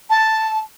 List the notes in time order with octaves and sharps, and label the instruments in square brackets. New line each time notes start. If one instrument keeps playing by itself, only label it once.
[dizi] A5